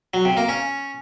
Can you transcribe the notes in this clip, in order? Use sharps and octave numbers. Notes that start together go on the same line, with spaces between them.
F#3
C3
A#3
C#4